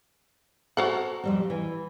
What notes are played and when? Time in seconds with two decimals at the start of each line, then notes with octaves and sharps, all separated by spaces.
0.77 F#4 A4 C5 F#5 A#5
1.24 F2 G3 C4
1.50 E3